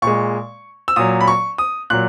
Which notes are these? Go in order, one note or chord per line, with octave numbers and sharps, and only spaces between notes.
A#2 G#3 C#6
E6
A#2 F#3 D#6
B5
C#6
D#6
A#2 F#3 F#6